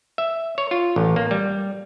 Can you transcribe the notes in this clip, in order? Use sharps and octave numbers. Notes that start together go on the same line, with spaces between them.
E5
C#5
F4
A1
A#3
G3